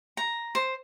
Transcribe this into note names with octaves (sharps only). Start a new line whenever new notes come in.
A#5
C5